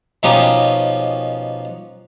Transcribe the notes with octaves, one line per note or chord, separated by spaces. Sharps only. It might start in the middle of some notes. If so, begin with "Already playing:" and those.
B2 F3 C#4 D#4 G4